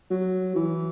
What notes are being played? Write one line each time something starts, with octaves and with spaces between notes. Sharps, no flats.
F#3
E3